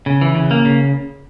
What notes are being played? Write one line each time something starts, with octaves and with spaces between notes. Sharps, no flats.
C#3
E3
C#3
A#3
C#3